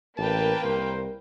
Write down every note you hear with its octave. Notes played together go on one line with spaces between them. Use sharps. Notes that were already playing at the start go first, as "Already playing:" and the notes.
A1 A#3 A#4 B4 G5 A5
C2 C5